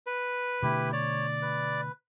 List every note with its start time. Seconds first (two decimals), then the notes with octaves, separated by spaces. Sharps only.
0.07 B4
0.63 B2 D3 A3 E4 G4
0.93 C#5 D5
1.42 B4